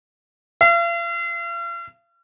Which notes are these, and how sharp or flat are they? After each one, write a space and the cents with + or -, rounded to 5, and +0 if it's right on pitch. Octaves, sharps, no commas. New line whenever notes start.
F5 -45